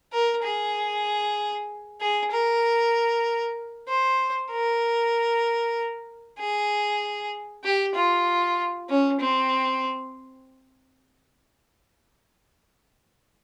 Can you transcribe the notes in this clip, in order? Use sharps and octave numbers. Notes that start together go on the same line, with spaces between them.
A#4
G#4
G#4
A#4
C5
A#4
G#4
G4
F4
C#4
C4